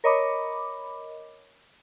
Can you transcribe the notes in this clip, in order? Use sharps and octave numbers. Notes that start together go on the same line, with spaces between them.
A#4 C#5 D#5 B5 D6